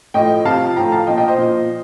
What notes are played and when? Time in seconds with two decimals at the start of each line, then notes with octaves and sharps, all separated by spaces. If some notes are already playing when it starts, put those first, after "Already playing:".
0.14 A2 F3 D#5 G5
0.45 C3 F3 F5 A5
0.76 A2 F3 G5 A#5
0.92 F5 A5
1.07 F3 D#5 G5
1.10 A#2
1.18 D#5 G5
1.28 C5 D#5
1.38 A#2 F3